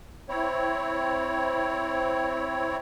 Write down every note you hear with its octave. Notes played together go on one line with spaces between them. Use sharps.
C4 E4 C#5